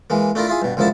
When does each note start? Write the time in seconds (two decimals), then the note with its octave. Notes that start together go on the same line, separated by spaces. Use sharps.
0.10 E3 G#3 A#3
0.35 A3 D4 E4 F4 A#4
0.47 E4 F4 G#4
0.62 G2 B2
0.77 C#2 D3 F3 A#3 E4 A5